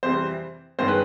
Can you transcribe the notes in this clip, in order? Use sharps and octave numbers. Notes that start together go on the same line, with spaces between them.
F2 C3 E3 G3 C5
G2 D#3 G#3 C#4 C5
B4